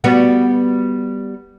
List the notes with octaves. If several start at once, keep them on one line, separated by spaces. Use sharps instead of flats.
G3 B3 F#4